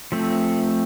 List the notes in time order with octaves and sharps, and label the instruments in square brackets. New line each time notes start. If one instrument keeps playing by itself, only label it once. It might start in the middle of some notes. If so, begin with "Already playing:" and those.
[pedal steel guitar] F3 A3 C4